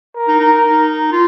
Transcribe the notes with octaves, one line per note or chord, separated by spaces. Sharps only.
A#4
D#4
D#4
D#4
F4